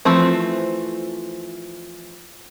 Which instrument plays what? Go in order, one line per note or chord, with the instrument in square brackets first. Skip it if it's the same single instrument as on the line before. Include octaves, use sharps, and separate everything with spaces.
[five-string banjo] E3 F3 A3 C4